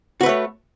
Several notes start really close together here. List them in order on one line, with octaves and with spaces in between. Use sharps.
F#4 B4 A3 C#5